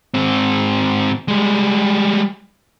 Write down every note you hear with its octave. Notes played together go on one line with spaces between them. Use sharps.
G#2 C4
G3 G#3